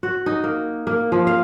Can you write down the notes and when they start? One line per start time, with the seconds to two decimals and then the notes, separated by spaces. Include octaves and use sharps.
0.03 F#4
0.26 D#4
0.44 A#3
0.87 A#3
1.12 F3
1.27 F5